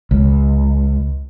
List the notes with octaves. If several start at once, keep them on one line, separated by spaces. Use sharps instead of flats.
C#2